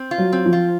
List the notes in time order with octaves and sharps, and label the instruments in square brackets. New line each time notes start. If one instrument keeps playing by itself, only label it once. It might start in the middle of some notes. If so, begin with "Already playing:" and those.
Already playing: [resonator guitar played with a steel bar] C4
F4
[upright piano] F#3
[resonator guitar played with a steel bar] C4
[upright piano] F3
[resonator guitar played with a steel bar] F4